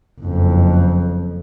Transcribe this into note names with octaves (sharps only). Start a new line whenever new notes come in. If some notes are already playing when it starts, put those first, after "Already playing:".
F#1 F2